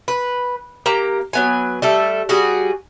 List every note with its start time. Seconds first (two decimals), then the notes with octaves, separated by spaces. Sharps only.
0.08 B4
0.86 A#3 G4 A#5
1.33 F#3 B3 G#5
1.82 G3 A3 A4
2.29 G3 F#4 G#4